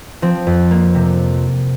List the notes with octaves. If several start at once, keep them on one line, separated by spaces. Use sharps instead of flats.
F3 C4
F2
A#3
C3